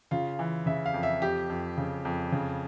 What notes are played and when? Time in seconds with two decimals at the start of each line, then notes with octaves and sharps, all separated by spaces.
0.11 C#3 F4
0.39 E3
0.66 C#3 E5
0.86 F5
0.94 F2
1.03 E5
1.22 F2 G4
1.50 F2
1.78 C#3
2.05 F2
2.32 C#3